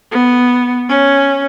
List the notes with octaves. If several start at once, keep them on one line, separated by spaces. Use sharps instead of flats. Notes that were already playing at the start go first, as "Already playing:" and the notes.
B3
C#4